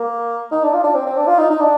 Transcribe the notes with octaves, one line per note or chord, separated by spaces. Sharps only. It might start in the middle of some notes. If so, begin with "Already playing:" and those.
Already playing: A#3
D#4
D4
F4
D4
C4
C4
D4
F4
D#4
D#4
D4